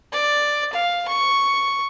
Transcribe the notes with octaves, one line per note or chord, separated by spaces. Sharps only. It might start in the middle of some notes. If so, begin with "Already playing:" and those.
D5
F5
C#6